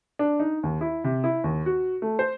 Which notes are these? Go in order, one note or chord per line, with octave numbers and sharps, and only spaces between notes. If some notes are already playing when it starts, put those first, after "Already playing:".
D4
D#4
D#2
E4
C3
E4
D#2
F#4
A3
C5